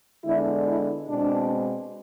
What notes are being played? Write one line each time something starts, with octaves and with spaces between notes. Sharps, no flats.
D3 G#3 B3 D4 E4
E4
B2 G#3 C4 D4